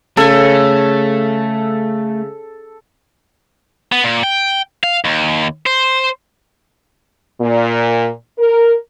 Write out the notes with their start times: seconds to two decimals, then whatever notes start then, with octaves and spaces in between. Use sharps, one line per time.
0.17 C#3 A3 A4 G#5
3.92 B3
4.04 A#2
4.23 G5
4.84 F5
5.05 D#2
5.66 C5
7.40 A#2
8.37 A#4